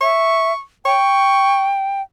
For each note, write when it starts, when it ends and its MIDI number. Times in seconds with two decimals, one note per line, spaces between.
0.01 0.53 76
0.01 0.61 85
0.86 2.02 79
0.86 1.68 85